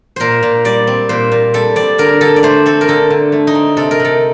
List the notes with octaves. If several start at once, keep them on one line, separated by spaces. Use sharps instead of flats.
A#2 A#4 C5
A#2
G3 D5
C4
A#2 C5
A#2
G3 A4
C4 D5
D3 A#4
D3 A4
D5
A3 C5
C4 A4
A#4
D3 A4
D3
A3
D#4
C4
C3 A4
A#4
C3 A4